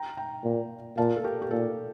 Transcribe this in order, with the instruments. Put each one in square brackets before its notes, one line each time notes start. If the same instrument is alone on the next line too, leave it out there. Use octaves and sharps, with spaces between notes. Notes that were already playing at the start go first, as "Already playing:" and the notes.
Already playing: [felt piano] G5 A#5
G5 A#5
[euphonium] A#2
[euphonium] A#2 [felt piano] F5 A5
[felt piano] A4
G4 A#4
G4
[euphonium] A#2 [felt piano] A4